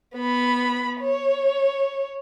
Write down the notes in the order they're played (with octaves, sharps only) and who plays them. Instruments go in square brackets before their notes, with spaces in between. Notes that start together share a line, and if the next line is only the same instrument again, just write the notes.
[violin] B3 B5
C#5